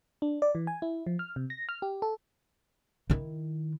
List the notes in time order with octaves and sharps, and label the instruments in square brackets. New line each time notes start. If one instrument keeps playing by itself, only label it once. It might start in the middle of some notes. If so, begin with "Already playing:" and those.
[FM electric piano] D4
D5
E3
G#5
E4
F3
F6
C3
A#6
F6
G4
A4
[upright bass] D#3 E4